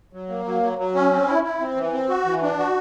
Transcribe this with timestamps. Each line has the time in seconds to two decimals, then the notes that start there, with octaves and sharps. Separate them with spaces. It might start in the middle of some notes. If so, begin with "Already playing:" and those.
0.13 F#3
0.29 A#3
0.45 F#3
0.62 F#3
0.79 F#3
0.95 C#4
1.11 C4
1.27 E4
1.44 E4
1.60 C4
1.76 E3
1.93 C4
2.09 F#4
2.26 E3
2.42 D4
2.58 F#4